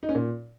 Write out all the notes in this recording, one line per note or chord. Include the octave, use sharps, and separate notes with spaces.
D#4
C#4
A#2